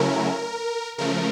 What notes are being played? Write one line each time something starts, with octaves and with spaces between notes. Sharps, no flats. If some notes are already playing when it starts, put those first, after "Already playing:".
Already playing: C#3 F#3 A3 C#4 E4 A#4
C#3 F3 A3 A#4